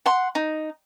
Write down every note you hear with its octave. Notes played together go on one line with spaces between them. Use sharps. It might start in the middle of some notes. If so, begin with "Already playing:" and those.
F#5 C6
D#4